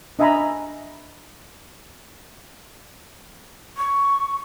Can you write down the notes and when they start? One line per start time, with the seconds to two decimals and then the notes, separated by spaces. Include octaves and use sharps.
0.19 D4 D#5 E5 G#5 A#5 B5
3.77 C#6